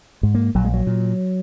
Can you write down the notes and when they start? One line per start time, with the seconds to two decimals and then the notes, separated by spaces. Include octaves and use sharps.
0.23 G#2
0.35 A#3
0.55 A#1 F#3
0.64 G#3
0.74 F#3
0.87 A#2